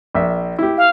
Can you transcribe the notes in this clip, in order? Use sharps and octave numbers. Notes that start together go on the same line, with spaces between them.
A#1 E5
E4 G4
F5